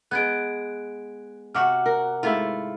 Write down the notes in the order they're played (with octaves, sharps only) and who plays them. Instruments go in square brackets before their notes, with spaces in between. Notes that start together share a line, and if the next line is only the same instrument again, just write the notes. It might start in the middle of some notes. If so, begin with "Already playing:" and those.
[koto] G#3 B3 [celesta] F#6 G#6 D7
[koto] C3 F#4 [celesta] F#5 D6 F6
[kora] A#4
[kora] G#2 A3 E4 [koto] F4